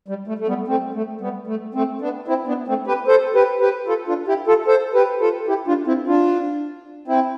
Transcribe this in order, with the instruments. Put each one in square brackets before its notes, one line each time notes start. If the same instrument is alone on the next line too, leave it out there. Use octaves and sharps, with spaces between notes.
[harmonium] G3
A3
A3
G3 B3
A3 C4
A3
G3 B3
A3
A3 C4
B3 D4
C4 E4
B3 D4
A3 C4
G4 B4
A4 C5
G4 B4
G4 B4
F4 A4
D4 F4
E4 G4
F4 A4
A4 C5
G4 B4
F4 A4
E4 G4
D4 F4
C4 E4
D4 F4
C4 E4